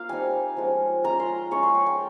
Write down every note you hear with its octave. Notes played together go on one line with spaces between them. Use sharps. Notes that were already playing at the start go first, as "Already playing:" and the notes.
Already playing: A#3 F4 F5
G3 C4 D#4 G#5
F3 G#3 C#4
G#3 C#4 F4 A#5
C6
G#3 C#4 F4 C#6
C6
G5
G5